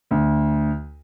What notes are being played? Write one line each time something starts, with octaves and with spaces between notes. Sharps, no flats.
D2